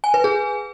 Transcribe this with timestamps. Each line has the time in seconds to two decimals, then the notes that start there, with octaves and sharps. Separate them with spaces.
0.04 G#5
0.14 B4
0.24 G#4